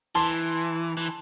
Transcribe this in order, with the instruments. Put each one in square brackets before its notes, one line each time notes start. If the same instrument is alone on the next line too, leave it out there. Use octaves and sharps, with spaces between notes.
[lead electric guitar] E3 [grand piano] A5 C6
[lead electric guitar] E3